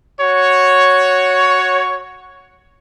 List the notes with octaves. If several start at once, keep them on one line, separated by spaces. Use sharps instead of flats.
F#4 C#5